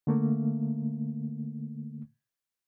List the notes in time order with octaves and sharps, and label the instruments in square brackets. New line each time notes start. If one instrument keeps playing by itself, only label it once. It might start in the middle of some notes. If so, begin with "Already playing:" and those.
[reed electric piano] D3 A3 A#3